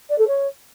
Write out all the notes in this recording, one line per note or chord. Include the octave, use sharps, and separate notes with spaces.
D5
A4
C#5